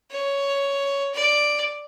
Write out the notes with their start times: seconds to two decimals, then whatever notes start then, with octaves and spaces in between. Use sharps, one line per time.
0.11 C#5
1.14 D5